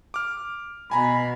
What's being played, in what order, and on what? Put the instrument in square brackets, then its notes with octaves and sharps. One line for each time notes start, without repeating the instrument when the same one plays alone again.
[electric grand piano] D6 F6
[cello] B2 [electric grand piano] G#5 A#5 [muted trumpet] B5